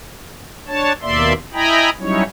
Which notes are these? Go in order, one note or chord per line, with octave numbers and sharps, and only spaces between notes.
D4 C#5 A5
D#2 B2 A#3 D5 E5 C6
E4 D#5 G5 G#5 A#5 B5
F#3 G3 C#4 D#4 E4 C#5